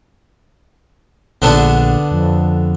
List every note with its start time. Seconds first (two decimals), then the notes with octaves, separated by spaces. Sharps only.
1.42 A#1 D3 B3 D4
2.12 F2